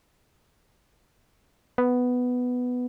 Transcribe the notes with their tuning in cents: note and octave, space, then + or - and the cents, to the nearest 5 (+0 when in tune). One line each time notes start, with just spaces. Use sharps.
B3 +5